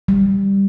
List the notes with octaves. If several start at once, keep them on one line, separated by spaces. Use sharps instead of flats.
G3